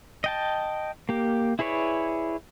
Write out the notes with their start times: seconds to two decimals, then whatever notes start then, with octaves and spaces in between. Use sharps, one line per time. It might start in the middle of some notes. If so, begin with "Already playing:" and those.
0.24 D#5 G5 A5
1.09 A#3 G4
1.59 E4 G#4 B4 C#5 D5